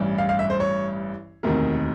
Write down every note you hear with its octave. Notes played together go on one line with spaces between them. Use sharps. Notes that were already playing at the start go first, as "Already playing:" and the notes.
Already playing: A1 G2 E3 G3
F5
F5
E5
C5
C#5
E1 D2 C3 D#3 A#4